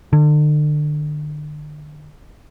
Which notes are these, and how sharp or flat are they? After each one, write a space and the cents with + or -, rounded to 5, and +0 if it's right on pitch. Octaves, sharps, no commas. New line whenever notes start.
D3 +35